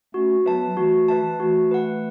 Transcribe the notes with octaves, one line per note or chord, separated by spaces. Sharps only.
A3 C#4 F#4
F#3 B3 B4 E5 A5
E3 A3 F#4
B4 E5 A5
E3 A3 F#4
B4 F#5